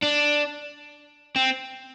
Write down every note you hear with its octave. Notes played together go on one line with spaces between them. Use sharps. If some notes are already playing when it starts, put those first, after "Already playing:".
D4
C4